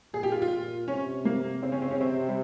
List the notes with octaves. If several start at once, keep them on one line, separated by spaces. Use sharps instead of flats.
A#2 G#4
G4
F4
F4
A#2
C3 C#4
A#3
C#3 C4
C#4
C4
C#4
C3 C4
G3